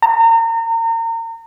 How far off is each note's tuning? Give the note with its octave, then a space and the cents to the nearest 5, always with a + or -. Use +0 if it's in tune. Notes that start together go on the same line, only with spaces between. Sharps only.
A#5 -35